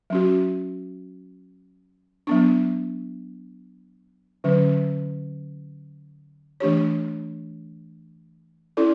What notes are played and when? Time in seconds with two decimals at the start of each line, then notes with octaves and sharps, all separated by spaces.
0.10 F#3 C#4 F#4
2.27 F#3 B3 D4
4.44 D3 F#3 C#4
6.60 E3 A3 D4 G4 C#5
8.77 C#4 E4 A4 D5